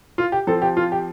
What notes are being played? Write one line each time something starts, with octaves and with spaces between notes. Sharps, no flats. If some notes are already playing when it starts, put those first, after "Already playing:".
F4
G4
F3 C4 A4
G4
F4
G4